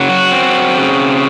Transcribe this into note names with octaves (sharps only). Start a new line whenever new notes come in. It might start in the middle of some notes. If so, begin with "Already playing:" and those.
Already playing: C#3 F#3
F#4
C4
C#3